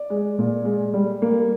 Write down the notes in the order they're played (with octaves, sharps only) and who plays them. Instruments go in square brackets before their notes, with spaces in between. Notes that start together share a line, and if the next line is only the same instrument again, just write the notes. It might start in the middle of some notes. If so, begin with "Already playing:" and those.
Already playing: [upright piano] D5
G#3
A#2
G#3
G3
A#3